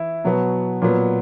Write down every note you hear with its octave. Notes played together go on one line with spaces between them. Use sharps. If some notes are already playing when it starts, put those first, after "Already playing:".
Already playing: E3 E4
B2 F#3 B3
A#2 F#3 B3